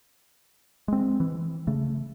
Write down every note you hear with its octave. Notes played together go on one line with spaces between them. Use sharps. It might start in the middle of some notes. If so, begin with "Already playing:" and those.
G#3 C4
E3
C#3 A3